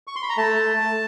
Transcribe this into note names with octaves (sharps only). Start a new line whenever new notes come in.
C#6
C6
B5
A#5
A3 A5